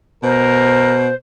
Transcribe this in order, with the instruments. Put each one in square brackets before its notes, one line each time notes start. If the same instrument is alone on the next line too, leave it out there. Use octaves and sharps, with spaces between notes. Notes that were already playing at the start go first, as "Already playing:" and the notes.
[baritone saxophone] B2 [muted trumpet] A#4 [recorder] C5